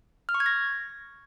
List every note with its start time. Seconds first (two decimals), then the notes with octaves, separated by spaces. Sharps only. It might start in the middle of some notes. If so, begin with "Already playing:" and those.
0.29 F6
0.34 C#6
0.40 G#6
0.46 A#6